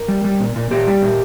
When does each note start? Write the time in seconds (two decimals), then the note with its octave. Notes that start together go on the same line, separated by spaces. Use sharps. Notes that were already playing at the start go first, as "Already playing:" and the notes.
Already playing: A#4
0.08 G3
0.24 G3
0.40 A#2
0.56 A#2
0.71 A#2 G4
0.87 G3
1.02 A#2